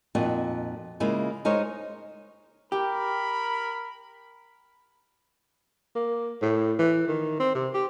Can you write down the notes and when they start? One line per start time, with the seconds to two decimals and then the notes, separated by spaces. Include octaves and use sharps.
0.15 F2 A#2 D#4 F#4
1.00 C#3 G#3 A#3 E4 F4 G#4
1.45 G#3 D#4 A#4 C5 C#5
2.72 G4 A#4 B5
5.95 A#3
6.41 A2
6.79 E3
7.08 D#3
7.39 C4
7.55 C3
7.74 G4